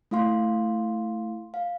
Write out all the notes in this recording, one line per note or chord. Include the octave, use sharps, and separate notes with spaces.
A3 E4 F5 C6
F5